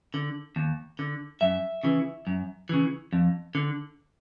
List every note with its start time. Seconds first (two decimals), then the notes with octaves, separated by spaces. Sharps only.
0.14 D3
0.56 D#2
0.99 D3
1.41 F#2 E5
1.83 C#3 E3
2.27 F#2
2.69 C#3 E3
3.13 F2
3.55 D3